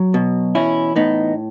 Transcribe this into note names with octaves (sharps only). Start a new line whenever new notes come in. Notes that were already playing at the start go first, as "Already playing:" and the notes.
Already playing: F#3
B2
E3 C#4 E4
A2 B3 D#4